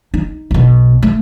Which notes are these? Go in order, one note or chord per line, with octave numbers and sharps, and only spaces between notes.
D#4
B1 B2
A3